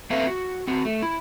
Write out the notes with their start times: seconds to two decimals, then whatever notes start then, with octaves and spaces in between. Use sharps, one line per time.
0.10 A#3 C4 A4 B4 E5 F5
0.27 F#4
0.67 C4 F#4
0.85 A3
1.02 E4